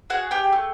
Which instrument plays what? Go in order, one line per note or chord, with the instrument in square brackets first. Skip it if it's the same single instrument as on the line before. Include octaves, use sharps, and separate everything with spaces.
[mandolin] F#4 G#4 F#5
G4 G5
A3